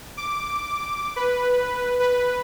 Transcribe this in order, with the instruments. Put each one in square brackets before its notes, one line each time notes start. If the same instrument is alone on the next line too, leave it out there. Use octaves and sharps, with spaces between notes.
[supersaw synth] D6
B4
B4